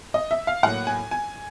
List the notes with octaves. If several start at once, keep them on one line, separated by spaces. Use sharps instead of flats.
D#5
E5
F5
A2 F#3 A#3 F#5
G#5
G#5